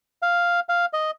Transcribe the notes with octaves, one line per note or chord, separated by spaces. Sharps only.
F5
F5
D#5